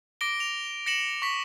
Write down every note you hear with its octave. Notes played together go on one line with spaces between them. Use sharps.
D6 A#6 D7 G7
F7
A#6 C#7 E7 F#7
C#6 B6